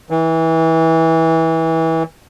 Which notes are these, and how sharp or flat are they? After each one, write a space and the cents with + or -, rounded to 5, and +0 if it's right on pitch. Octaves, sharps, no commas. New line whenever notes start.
E3 -25